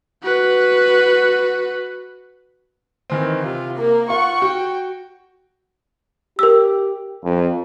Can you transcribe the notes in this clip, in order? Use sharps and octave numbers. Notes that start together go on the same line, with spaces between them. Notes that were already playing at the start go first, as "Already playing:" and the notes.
F#4 B4
D#3 E3 C4
C3 F4
A#3 A#4
F4 F#5 C#6
F#4 G5
G4 A#4 E6
F2